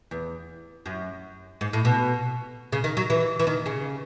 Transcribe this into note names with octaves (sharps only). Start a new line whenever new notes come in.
E2
F#2
G#2
A2
B2
C#3
D#3
F#3
E3
E3
D#3
C#3